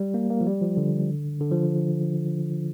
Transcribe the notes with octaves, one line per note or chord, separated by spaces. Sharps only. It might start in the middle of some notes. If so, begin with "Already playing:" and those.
Already playing: G3
A#3
A#3
F3
G3
F3
D3
D3
F3